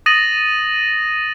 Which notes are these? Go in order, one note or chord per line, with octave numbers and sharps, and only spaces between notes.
D#6 A6 A#6 D#7 F#7